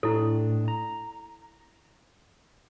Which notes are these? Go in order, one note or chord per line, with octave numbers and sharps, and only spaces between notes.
A2 D4 E4 A4
A#5